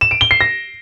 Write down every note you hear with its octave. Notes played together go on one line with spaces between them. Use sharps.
E7
D7
G7
C7
A#6